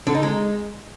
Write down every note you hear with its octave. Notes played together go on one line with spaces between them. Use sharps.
D3
D#4
G#3